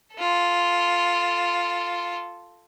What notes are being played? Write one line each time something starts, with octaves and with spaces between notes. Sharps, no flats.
F4 A4